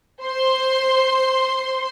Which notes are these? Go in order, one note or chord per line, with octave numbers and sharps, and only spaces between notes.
C5 C6